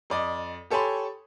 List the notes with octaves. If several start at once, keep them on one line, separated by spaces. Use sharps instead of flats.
F2 D5 D#5
G4 A4 C#5 G#5 B5 C6